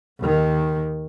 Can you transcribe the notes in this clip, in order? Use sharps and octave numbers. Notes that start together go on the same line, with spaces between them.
D#2 D#3